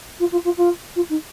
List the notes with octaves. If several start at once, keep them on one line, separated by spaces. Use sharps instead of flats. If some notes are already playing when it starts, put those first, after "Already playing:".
F4
F4
F4
F4
F4
D#4